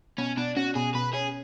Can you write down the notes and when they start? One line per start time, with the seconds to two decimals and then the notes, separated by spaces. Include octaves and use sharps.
0.18 B2 C#4
0.37 B2 D4
0.57 C#4 F#4
0.76 B2 G#4
0.95 B2 B4
1.14 C#4 G#4